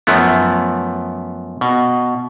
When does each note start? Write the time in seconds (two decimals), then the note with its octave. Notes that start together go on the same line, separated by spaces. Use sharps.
0.07 F#2 F3 A3 B3
1.61 B2